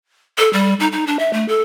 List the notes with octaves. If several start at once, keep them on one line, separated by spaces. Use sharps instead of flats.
A4
G3
D#4
D#4
D4
E5
A3
A4